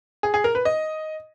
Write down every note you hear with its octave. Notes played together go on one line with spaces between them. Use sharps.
G#4
G#4
A#4
B4
D#5